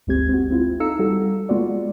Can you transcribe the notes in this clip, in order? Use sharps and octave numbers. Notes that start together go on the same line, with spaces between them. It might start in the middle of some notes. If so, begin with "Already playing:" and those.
G1 D2 G#3 C4 G4 G#6
C4 F#4
C4 E4 F4
D#4 A4 F5 A#5 E6 C#7
G3 F#4 A4
G#3 B3 F4 F#4 D5